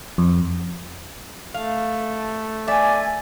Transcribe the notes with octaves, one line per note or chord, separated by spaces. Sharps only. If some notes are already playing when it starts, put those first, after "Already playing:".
F2
A3 F5
D5 E5 G#5